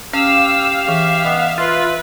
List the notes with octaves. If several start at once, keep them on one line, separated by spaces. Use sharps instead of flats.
C#4 G4 F5 E6
E3 G#4 E5
B3 D#5 G5
F4 B4 E5